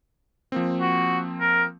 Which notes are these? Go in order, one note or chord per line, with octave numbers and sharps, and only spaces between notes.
F3 A#3 C4
F#4
A#4